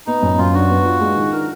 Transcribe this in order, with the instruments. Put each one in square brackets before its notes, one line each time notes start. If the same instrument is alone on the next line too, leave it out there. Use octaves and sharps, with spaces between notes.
[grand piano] B3 [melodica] D#4
[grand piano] F#2
[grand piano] F#2 [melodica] F4
[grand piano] D4 [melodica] F#4
[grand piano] B3
F4
G#3
D#3
[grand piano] D4 [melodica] A#4